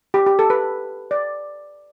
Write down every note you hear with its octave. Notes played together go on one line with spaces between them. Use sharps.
G4
G4
A4
B4
D5